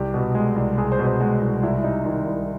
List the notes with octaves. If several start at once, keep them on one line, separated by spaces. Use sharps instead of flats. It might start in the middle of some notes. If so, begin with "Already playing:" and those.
Already playing: C2 G4
B2
G#3
C2
C2 G#4
C5
B2
C5
G#3 F#4
C2
C2 E4
C3 D#4
D#3 E4
C2